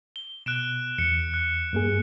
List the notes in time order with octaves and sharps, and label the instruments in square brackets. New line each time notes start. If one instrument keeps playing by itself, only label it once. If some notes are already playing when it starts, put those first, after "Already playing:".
[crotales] G7
[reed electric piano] B2 [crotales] F#6 D7 E7
[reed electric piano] E2 [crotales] C#7
[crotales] F#6
[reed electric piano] G2 A#3 G#4